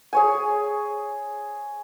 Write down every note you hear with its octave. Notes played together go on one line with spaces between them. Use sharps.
G#4 C#5 G#5